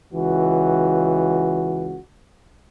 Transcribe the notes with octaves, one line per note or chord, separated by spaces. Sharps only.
C#2 E3 F#4